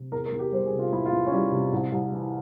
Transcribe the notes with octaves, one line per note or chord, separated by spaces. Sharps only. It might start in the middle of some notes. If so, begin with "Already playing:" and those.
Already playing: C3
E2 A#4
A#4
E2
G4
G3 C5
G#4
C3
F4
E2 E4
F4
E2
C#4
G3 E4
C3
C2
C2
E3